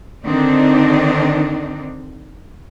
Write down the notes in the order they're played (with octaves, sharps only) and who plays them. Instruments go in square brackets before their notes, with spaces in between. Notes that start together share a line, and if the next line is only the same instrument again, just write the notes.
[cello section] D3 D#3 C4 D4 D#4